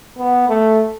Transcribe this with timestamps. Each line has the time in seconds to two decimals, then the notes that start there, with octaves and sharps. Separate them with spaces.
0.18 B3
0.49 A3